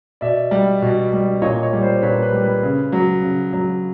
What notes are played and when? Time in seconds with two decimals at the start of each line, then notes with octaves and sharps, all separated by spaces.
0.21 B2 D5 E5
0.51 G3
0.82 B2
1.13 G3
1.42 A#2 C#5 D#5
1.62 C#5 D#5
1.73 G3
1.82 C5 D5
2.02 A#2 B4 C#5
2.22 B4
2.32 G3
2.43 B4
2.63 C#3
2.92 F#3
3.23 C#3
3.53 F#3